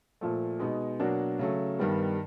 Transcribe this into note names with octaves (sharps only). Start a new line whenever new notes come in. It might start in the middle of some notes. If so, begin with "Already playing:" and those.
A#2 F3 A3
B2 G#3 B3 D#4
B2 F#3 A#3 D4 F#4
C#3 F#3 A3
G2 D#3 G3 B3